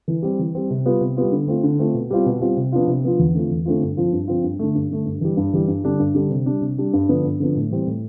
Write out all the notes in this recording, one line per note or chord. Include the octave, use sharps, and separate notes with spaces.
E3
G3 C4
E3
G3 C4
C3
G3 B3 F4
C3
G3 B3 F4
D3
A3 C4 F4
D3
A3 C4 F4
B2
G3 C4 F4
B2
G3 C4 F4
C3
F3 B3 D4 F4
C3
F3 B3 D4 F4
E2
D3 A3 C4 F4
E2
D3 A3 C4 F4
G2
F3 C4 F4
G2
F3 C4 F4
G2
D3 A3
G2
D3 A3
G2
E3 G3
G2
E3 G3
G2
D3 G3 D4
G2
D3 G3 D4
C3
G3 D4
C3
G3 D4
G2
D3 F3 B3 D4
G2
D3 F3 B3 D4
A2
E3 G3 C4
A2